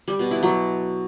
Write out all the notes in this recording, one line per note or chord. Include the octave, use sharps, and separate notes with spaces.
G3
B2
E4
F#3